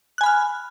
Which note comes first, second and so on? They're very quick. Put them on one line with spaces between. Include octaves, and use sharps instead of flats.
F#6 G#5 B5 F6